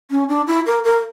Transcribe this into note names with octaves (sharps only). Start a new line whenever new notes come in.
C#4
D4
E4
A#4
A#4